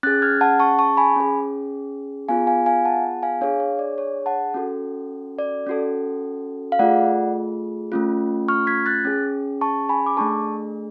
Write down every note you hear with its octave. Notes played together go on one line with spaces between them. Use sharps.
C#4 G#4 F#6 A6
F6 G#6
F#5 A5
A5 C#6
A5 C#6
G#5 B5
C#4 G#4
B3 F4 G#4 F5 G#5
F5 G#5
F5 G#5
F#5 A5
F5 G#5
D4 G#4 C#5 F5
C#5
D5
C#5
F#5 A5
C#4 F#4 A4
D5
C#4 F#4 A4
F5
A3 F4 G#4 D5 F#5
A3 C#4 F4
C#6 F6
G#6 B6
F#6 A6
C#4 G#4
A5 C#6
G#5 B5
D6
A3 D4 G#4 A5 C#6